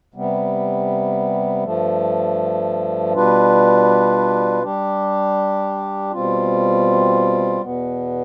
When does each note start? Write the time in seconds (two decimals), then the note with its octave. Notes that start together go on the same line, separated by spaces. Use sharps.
0.14 C3 G3 B3
1.64 G2 F3 A3
3.13 B2 G3 D4 F4 B4
4.62 G3 D4 G4
6.12 B2 G3 C4 F4
7.61 E2 B2 B3